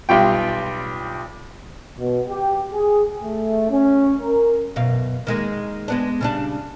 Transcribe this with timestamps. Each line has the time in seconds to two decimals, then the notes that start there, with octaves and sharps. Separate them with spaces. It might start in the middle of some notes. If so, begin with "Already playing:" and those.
0.09 B1 G3 F4 G5
1.99 B2
2.28 G4
2.73 G#4
3.23 A3
3.69 C#4
4.22 A#4
4.76 F#2 B2 F5
5.27 D#3 G#3 A#3
5.88 G#3 B3 D4
6.21 C#3 G3 D4